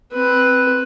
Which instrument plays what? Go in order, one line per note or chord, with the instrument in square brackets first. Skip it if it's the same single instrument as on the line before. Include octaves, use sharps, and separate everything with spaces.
[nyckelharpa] C4 B4